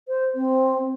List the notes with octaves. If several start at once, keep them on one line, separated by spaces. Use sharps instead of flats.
C5
C4